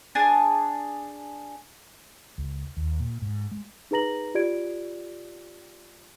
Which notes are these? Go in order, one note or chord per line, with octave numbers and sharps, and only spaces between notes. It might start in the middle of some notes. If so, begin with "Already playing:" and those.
D4 G#4 G#5 A5
C#2
D#2
A#2
G#2
G#3
D#4 G#4 B4 A#5 A#6 F#7
F4 G4 D5 G#6 D7